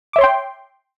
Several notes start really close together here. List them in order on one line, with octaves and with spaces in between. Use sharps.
D6 E5 C#5 C6 G5